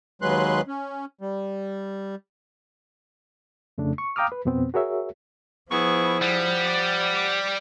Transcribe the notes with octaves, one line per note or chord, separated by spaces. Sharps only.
D#2 F#3 G#3 B4 C6 F#6
C#4
G3
F2 C#3 A3 D4
C#6
F5 G5 A#5 D6 D#6 F6
B4
F2 B2 B3 C4
F#4 G#4 A#4 C#5 E5
F3 B3 E4 G#4 C#6
G3 F#5
D5
D6